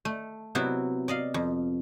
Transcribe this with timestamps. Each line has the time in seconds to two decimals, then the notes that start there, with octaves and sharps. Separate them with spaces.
0.05 A3
0.55 C3 F#3 B3 E4
1.08 D5 D#5 F5
1.34 F2